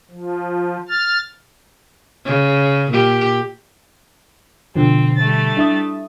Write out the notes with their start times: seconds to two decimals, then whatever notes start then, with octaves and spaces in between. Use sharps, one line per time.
0.11 F3
0.89 F6 A6
2.25 C#3
2.91 A#2 G4
4.76 B2 D3 F3 C4
5.17 G3 A3 A6
5.57 D4 E4 D#6